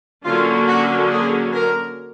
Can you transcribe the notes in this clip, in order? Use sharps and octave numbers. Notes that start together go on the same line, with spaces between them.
D3 F#3 A#3 C#4 F4
F#4
G#4
A#4